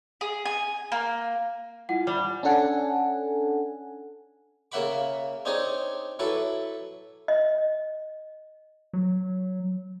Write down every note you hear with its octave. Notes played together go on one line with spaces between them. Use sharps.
G#4
G#5
A#3
E4 F4 F#5 G#5
G3
C#4 D4 A4 F#5 G#5
C#3 A#3 E5 F#5 B5 D6
C4 D4 D#4 G#4 C#5
F#3 E4 A4 B4 D6
D#5
F#3